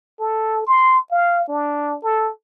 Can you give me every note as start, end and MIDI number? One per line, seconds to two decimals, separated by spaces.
0.19 0.65 69
0.66 0.99 84
1.11 1.45 77
1.48 1.96 62
2.03 2.30 69